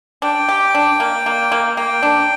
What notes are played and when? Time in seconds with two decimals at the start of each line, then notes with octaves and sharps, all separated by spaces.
0.22 D4 G5
0.49 G4
0.75 D4
1.00 A#3
1.26 A#3
1.52 A#3
1.77 A#3 G5
2.03 D4